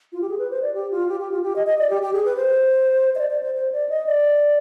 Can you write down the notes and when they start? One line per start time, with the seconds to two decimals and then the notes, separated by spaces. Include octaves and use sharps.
0.13 F4
0.21 G4
0.29 G#4
0.39 B4
0.51 C5
0.62 D5
0.74 G4
0.91 F4
1.09 G4
1.20 G4
1.32 F4
1.43 G4
1.56 D#5
1.67 D#5
1.79 D5
1.90 G4
2.02 G4
2.13 G#4
2.25 B4
2.36 C5
3.15 D#5
3.19 D5
3.30 D5
3.43 C5
3.54 C5
3.72 D5
3.89 D#5
4.07 D5